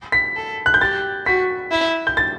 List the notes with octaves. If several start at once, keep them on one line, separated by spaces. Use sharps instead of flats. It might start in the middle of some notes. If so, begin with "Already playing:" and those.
B6
A4
F#6
G6
G4 A6
F#4 B6
E4
G6
A6